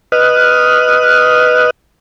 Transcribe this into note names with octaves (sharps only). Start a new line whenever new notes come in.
B4 D#5 D#6 F6 F#6